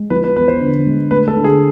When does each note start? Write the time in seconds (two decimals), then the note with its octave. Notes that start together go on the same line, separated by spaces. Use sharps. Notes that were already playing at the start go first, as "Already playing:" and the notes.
Already playing: G#3
0.10 F3 B4
0.24 B4
0.36 E2 B4
0.48 C5
0.60 D3
0.86 G#3
1.11 A3 B4
1.28 A4
1.37 D3
1.44 G#4